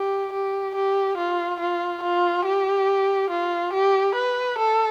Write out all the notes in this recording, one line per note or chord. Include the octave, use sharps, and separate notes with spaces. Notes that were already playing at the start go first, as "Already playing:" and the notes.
Already playing: G4
G4
G4
F4
F4
F4
G4
F4
G4
B4
A4